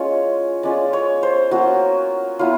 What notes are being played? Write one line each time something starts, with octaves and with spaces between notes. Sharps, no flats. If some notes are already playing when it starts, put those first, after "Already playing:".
Already playing: G#3 C#4 F4 C#5
G#3 C#4 F4 D5
C#5
C5
F#3 A#3 C#4 F4 F#4
F#3 B3 E4 F4